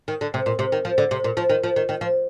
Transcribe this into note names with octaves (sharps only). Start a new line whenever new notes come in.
D#3
D3
C3
A#2
C3
D#3
F3
D3
C3
A#2
F3
D#3
F3
D#3
D#3
F3